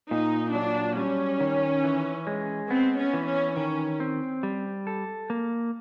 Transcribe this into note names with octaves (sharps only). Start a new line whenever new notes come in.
A#2 D#4
F#3 D4
G3 C#4
D#3
E3
G#3
B3 C4
C#4
E3
C#4
D#3 C#4
C4
G3
A4
A#3